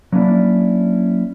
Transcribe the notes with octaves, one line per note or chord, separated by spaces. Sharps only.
F#3 A#3 C#4 D4 E4 D5